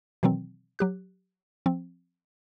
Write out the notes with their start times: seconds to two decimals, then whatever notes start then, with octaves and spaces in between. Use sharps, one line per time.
0.23 B2 D#3 E3 F#3 C4
0.79 F#3 G4 F#6
1.66 F3 C4